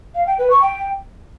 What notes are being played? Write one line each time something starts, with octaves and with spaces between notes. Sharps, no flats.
F5
G5
B4
C#6
G5